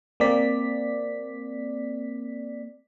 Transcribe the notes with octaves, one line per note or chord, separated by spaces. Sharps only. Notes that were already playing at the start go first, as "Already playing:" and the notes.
A#3 C4 D5 B6